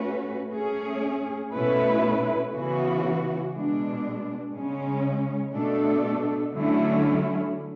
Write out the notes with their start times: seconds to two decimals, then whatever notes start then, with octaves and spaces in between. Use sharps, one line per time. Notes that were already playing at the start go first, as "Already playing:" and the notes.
Already playing: A3 C#4 F#4 B4
0.53 A3 C#4 G#4
1.53 B2 A3 C#4 E4 B4
2.53 C#3 E3 B3 F#4
3.53 B2 G#3 D4
4.54 C#3 G#3 C#4
5.53 B2 A3 D4 A4
6.54 D3 F#3 A3 C#4 E4